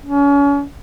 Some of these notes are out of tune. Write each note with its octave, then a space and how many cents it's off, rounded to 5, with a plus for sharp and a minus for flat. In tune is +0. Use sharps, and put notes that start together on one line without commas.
C#4 +35